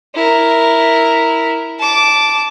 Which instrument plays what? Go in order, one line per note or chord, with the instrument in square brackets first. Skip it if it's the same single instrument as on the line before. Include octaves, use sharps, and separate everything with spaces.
[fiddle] E4 A#4
A5 D6